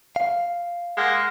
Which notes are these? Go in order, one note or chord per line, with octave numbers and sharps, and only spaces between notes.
F5
G#3 A#3 F#5